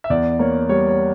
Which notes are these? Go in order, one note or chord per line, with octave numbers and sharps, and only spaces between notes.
E5
E2 D5
A#3 C#5
G3 C#5
C#5